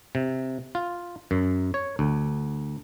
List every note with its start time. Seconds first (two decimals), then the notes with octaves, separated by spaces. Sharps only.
0.15 C3
0.75 F4
1.31 F#2
1.74 C#5
1.99 D2